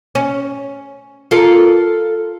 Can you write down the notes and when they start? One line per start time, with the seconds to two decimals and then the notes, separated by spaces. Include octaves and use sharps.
0.15 C#4
1.31 F4 A4 A#4